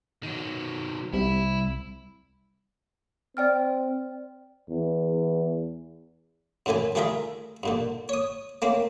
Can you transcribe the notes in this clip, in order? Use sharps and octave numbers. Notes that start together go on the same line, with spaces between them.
D#3 F#3
C2 E4
C4 D5 G5 F6
E2
F#2 A2 D3 E3 G#5
G3 A3 F4 G#4 A#4 E5
G2 A#2 D3
C#5 D#6
A3 A#3 C4 C#4